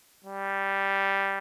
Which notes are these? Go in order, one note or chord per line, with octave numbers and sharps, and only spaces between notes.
G3